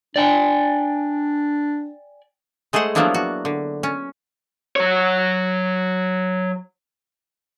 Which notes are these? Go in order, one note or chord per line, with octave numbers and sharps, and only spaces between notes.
D4 D5 G5 G#5
G#3 A3 G#4 C5 F#5
F3 F#3 A#3 B3 D4 E4
F#4
D3
C#4
F#3 C#5